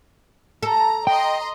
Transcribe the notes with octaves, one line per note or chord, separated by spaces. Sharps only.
A4 A#5
D#5 G5 A#5 C6